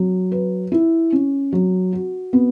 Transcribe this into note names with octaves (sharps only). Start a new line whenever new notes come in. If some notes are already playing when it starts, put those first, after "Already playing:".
Already playing: F#3
B4
E4
C#4
F#3
F#4
B3